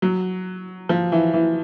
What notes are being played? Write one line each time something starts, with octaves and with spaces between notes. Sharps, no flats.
F#3
F3
E3
E3